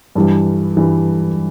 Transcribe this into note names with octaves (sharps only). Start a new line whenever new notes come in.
G2 E3 G3
G2 E3 G3